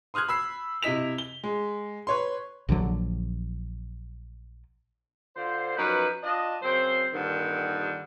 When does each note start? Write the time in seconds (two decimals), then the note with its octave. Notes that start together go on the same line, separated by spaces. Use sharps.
0.14 C6 D#6 F6 F#6 G#6
0.28 B5 E6 C7
0.83 C3 E4 D#5 B6 F7
1.18 G7
1.44 G#3
2.07 B4 C#5 C6
2.69 A#1 D3 F3 F#3
5.36 D3 F4 C5
5.77 F#2 F3 D#4 B4
6.23 D4 F4 D#5
6.62 F#2 C#3 C4 C5
7.14 G2 A#2 D3 D#3 G3